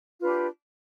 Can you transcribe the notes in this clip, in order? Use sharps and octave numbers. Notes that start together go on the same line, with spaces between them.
D4 F4 G4 B4